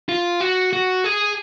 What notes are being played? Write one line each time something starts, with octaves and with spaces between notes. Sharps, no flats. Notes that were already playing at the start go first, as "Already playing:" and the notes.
F4
F#4
F#4
G#4